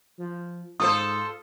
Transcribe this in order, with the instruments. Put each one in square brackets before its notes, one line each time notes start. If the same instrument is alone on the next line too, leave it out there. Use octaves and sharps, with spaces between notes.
[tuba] F3
[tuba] G#2 [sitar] F4 A4 C5 [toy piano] D#6